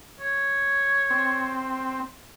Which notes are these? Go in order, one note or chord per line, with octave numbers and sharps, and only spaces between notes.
C#5
C4